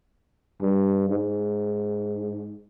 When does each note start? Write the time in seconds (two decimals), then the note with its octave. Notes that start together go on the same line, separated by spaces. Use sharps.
0.62 G2
1.09 G#2